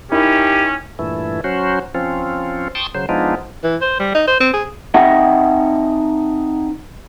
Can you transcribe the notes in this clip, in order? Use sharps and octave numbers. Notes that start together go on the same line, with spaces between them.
C#4 D#4 E4 G4 A#4
G2 A#2 E3 A3 E4
F#3 C#4 F#4 C5
F3 C4 C#4 F4
G5 A5 C6 C#6 D#6
C#3 F#3 C5
F3 G#3 B3 D4 D#4 F4
E3
C5
G3
D#4
C5
C4
G#4
C4 D#4 D#5 E5 F#5